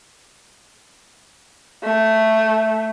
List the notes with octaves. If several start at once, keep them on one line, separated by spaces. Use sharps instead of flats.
A3